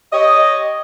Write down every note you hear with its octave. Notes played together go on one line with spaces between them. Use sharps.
G4 C#5 D#5